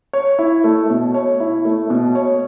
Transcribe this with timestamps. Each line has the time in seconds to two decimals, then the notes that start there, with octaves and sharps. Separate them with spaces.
0.13 C#5
0.39 E4
0.64 A3
0.90 B2
1.14 C#5
1.40 E4
1.65 A3
1.90 B2
2.15 C#5